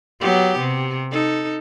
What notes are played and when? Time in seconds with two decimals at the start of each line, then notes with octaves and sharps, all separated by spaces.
0.21 F#3 B3 G4
0.58 C3
1.12 D#4 A4